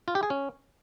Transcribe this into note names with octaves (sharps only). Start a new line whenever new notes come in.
F4
G4
G#4
C#4